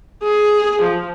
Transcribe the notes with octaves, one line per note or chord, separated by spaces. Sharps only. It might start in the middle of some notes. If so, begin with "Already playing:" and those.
G#4
F3